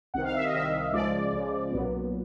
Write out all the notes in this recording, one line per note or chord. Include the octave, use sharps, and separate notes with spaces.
C2 C3 D#3 F#5
F5
E5
D#5
C2 C3 D#3 E5
C#2 C#3 F3 G#3 D5
C#2 C#3 F3 G#3
B1 A#2 F#3 B3